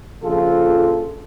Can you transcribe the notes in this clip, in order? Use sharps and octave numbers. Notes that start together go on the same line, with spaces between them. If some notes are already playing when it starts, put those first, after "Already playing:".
A#1 C#3 F3 F4 G#4 A4